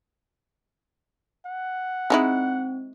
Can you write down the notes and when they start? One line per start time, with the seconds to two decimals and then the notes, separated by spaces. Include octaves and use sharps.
1.46 F#5
2.10 G#3 C4 D#4 E4